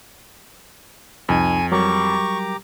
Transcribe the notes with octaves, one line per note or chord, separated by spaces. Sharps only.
C2 F2 D#4 G#5
F#3 G3 G4 A#4 A#5 C#6 D6